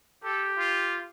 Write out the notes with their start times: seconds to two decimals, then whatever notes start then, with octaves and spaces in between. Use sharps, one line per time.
0.24 G4 A4
0.58 F4